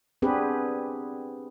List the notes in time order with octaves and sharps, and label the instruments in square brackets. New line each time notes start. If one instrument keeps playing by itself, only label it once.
[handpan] B3 C4 D4 G4 G#4 B4